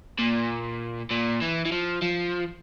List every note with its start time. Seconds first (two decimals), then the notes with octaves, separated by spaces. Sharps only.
0.19 A#2
1.11 A#2
1.42 E3
1.66 E3
1.72 F3
2.02 F3